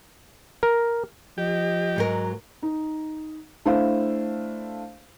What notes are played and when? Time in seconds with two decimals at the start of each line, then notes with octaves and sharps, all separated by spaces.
0.63 A#4
1.38 F3 G4 D#5
1.96 G#2 F#3 A#4
2.63 D#4
3.65 A3 D4 E4 C5 F5